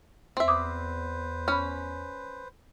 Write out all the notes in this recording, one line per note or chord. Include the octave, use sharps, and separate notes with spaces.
E2 C4 E5
B4 C5 D6 D#6
C#4 B5 F6